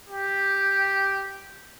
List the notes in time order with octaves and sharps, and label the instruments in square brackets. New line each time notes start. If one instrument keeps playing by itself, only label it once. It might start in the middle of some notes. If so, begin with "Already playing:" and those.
[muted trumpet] G4